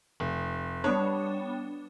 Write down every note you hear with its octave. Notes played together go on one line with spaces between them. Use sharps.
F1
G3 B3 D4 C#5